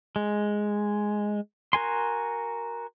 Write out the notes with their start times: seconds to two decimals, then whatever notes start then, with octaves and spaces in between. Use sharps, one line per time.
0.16 G#3
1.73 F#4 A#4 G#5 C6